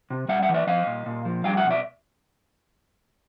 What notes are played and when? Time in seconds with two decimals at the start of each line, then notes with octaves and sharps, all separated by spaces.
0.10 C3
0.28 G3 E5 F#5
0.42 E5 F#5
0.49 E3
0.54 D5 E5
0.67 F3 D#5 F5
0.87 A#2
1.06 A#2
1.25 F3
1.44 G3 F5 G5
1.57 E5 F#5
1.64 B2
1.70 D5 E5